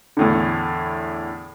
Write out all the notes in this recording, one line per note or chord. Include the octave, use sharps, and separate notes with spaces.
E2 A2 D3